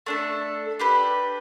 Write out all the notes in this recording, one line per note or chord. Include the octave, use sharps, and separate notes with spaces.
A3 D4 A4
D4 G4 B4